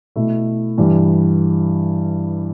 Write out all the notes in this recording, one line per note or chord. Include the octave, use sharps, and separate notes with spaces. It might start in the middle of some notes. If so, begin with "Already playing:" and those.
B2 A3 E4
G2 E3 G3